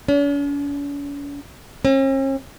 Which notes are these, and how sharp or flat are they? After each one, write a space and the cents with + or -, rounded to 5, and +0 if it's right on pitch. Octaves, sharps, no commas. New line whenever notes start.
C#4 +45
C#4 -45